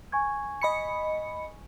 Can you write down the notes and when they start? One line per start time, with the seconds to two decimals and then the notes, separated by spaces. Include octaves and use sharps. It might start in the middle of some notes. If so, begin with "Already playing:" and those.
0.12 G#5 C#6 G#6
0.62 D#5 B5 C#7